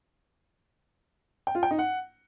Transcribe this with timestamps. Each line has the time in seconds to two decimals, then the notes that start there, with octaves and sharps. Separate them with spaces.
1.47 G5
1.55 F4
1.63 G5
1.71 D#4
1.79 F#5